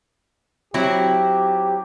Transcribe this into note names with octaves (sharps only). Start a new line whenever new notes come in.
F#3 C4 E4 G4